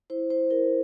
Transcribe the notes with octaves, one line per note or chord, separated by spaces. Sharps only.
E4 C5
E4 C5
E4 A#4